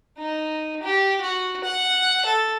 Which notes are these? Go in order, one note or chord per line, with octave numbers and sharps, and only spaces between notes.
D#4
G4
F#4
F#5
A4